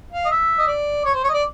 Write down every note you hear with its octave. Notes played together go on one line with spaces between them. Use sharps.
F5
D#5
E5
D#5
D5
C#5
C5
C#5
D#5
D5